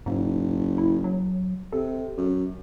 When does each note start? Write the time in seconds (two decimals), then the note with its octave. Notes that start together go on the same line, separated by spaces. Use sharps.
0.06 F#1 G#2
0.78 E4
1.04 F#3
1.72 C3 A4
2.17 F#2